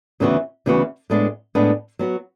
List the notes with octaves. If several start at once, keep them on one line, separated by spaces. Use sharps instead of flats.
D2 C#3 E3 B3 F#4
D2 C#3 E3 B3 F#4
A2 G#3 B3 D4
A2 G#3 B3 D4
F#3 B3 F#4